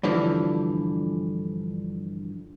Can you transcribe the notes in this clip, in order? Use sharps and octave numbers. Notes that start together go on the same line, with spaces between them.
G2 D3 E3 F3